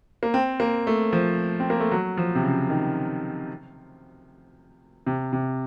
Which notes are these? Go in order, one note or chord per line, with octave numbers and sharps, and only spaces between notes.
A#3
C4
A#3
A3
F3
C4
A#3
A3
F#3
F3
C3
C#3
D#3
C3
C3